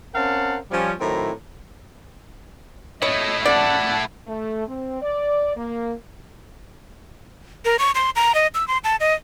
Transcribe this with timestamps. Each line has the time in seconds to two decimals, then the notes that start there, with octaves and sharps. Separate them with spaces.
0.15 C4 C#4 A#4 F5 F#5 A5
0.71 F3 G3 C#4
1.00 A2 D#3 F#3 C4 E4 A#5
3.02 A3 E4 C#5 D#5
3.46 D5 F#5 A5
4.27 A3
4.67 C4
5.02 D5
5.56 A#3
7.65 A#4
7.79 C#6
7.95 C6
8.16 A#5
8.35 D#5
8.55 E6
8.68 C6
8.84 A5
9.00 D#5